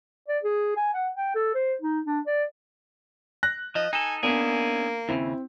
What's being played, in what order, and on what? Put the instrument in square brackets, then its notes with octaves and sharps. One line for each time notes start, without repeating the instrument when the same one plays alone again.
[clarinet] D5
G#4
G#5
F#5
G5
A4
C5
D#4
D4
D5
[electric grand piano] F#6 A#6
[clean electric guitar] F3 [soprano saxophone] D#5
[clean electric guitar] D#4 A4 [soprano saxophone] G#5
[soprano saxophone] A#3 [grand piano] B3 D4 [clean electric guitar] C#4 E4 G#4
[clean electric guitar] D#2 A#2 C#3 [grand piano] C4 [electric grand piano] E4